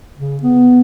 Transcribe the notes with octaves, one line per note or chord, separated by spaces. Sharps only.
C#3
B3